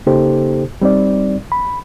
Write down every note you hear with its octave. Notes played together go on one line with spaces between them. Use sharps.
C#3 A#3 D#4 G4 A4 C5
G3 C4 D#4 D5
B5